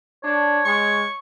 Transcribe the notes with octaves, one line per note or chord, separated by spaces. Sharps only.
D4 C#5
G#3 C#6